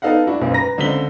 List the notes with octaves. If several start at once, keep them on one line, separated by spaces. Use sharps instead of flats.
B3 D#4 A4 D#5 F5 F#5
D4 E4 F#4
F#1 B1 C#3 A#3 B3
B4 A#5 A#6
C#2 D3 C4 B6 G7